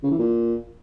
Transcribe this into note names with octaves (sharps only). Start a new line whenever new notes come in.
C#3
E3
A#2